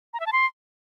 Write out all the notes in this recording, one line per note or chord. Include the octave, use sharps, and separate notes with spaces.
A#5
E5
A5
C6